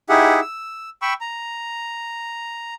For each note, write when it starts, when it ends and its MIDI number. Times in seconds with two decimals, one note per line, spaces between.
0.09 0.40 63
0.09 0.40 64
0.09 0.40 67
0.09 0.40 68
0.09 0.40 76
0.09 0.40 78
0.41 0.90 88
1.02 1.14 79
1.02 1.14 83
1.02 1.14 85
1.02 1.14 88
1.21 2.74 82